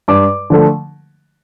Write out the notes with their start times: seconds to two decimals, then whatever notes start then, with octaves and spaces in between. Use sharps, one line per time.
0.08 G2 D6
0.50 D3 F3 A3